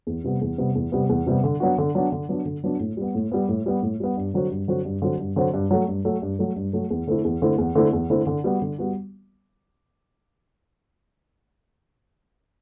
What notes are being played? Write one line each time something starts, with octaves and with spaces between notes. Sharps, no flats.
E2
C3 G3 B3
E2
C3 G3 B3
E2
C3 G3 B3
E2
C3 G3 B3
D3
F#3 B3 D4 F#4
D3
F#3 B3 D4 F#4
D3
F#3 B3 D4 F#4
D3
F#3 B3 D4 F#4
A2
G3 B3
A2
G3 B3
A2
G3 B3
A2
G3 B3
G2
D3 F#3 C4 F#4
G2
D3 F#3 C4 F#4
G2
D3 F#3 C4 F#4
G2
D3 F#3 C4 F#4
G2
F#3 A3
G2
F#3 A3
G2
F#3 A3
G2
F#3 A3
E2
D3 A3 C4 E4
E2
D3 A3 C4 E4
E2
D3 A3 C4 E4
E2
D3 A3 C4 E4
D3
G3 B3 F#4
D3
G3 B3 F#4